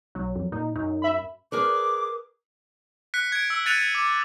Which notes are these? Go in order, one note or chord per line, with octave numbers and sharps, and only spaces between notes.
B1 F#3
F2
A#2 D#4
F#2 D#4
E5 B5
G#4 A#4 B4 D6
F#6 B6 C#7
G#6 D7
E6
F#6 A6 C#7 D#7 F7
C#7
D6